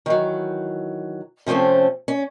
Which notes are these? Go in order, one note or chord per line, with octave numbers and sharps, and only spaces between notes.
D#3 E3 F#3
C3 F3 A3 C4 C#4
C#4